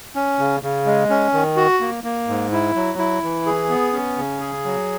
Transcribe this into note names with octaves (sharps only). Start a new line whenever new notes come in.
C#4
C#3
C#3
G#3
C#4
D#3
F#4
A#3
A#3
G#2
E4
F#3
E4
E3
G#4
B3
C#4
C#3
G#4
F#3